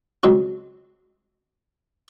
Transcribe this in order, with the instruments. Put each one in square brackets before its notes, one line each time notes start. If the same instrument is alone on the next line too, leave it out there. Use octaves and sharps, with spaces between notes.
[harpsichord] C#2 F#3 G#3 C4 C#4